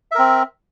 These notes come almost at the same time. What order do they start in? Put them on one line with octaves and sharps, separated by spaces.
E5 A#4 C4